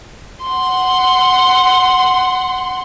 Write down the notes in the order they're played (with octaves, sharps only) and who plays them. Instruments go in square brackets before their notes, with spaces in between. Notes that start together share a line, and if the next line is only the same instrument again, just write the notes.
[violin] F#5 C6